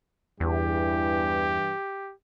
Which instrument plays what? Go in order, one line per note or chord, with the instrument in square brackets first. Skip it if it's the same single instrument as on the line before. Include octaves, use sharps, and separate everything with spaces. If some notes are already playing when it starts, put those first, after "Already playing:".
[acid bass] E2 [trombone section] G2 E3 [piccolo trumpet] G4